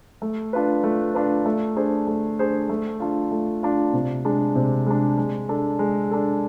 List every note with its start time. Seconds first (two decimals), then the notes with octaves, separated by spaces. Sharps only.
0.22 A3
0.53 D4 F4 B4
0.84 A3
1.14 D4 F4 B4
1.46 A3
1.76 D4 G#4 C5
2.07 A3
2.39 D4 G#4 C5
2.69 A3
3.00 D4 F4
3.31 A3
3.63 D4 F4
3.93 C3
4.25 G#3 D4
4.55 C3
4.87 G#3 D4
5.18 G#3
5.49 D4 A4
5.79 G#3
6.11 D4 A4